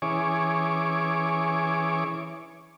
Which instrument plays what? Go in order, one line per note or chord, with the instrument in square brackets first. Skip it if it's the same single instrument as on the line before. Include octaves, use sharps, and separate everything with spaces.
[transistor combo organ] E3 C#4 G#4 C#5 D6